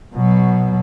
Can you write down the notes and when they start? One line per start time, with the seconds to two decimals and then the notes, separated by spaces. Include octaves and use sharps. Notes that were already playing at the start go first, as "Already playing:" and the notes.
0.15 B2 F#3